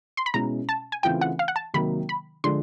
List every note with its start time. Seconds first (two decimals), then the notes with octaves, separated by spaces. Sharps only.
0.17 C6
0.26 B5
0.34 B2 G#3 C#4 E4 A#5
0.69 A5
0.92 G#5
1.03 C#3 E3 A3 C4 F4 G5
1.21 F#5
1.39 F5
1.48 F#5
1.56 A5
1.74 C3 D#3 F#3 A#3 B5
2.09 B5
2.44 D3 F3 G#3 C6